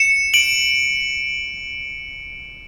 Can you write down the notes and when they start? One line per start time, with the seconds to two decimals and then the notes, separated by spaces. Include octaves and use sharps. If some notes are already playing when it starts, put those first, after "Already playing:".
Already playing: C#7 E7
0.34 D7 F#7